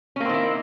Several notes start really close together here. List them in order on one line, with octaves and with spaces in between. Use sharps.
C#4 A#3 C4 D#3 E4